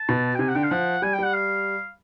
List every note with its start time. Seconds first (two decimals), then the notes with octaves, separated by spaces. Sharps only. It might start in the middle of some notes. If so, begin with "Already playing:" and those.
Already playing: A5
0.09 B2
0.35 G5
0.39 C3 G#5
0.48 F#5
0.55 D3 G5
0.64 F5
0.71 F3 F#5
1.02 G3 G#5
1.13 G5
1.19 G3 F#5
1.33 F5